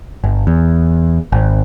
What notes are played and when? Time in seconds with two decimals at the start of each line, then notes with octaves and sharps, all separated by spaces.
0.24 G1
0.47 E2
1.32 G#1